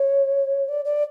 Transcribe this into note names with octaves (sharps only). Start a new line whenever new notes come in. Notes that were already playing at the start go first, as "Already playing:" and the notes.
Already playing: C#5
D5
D5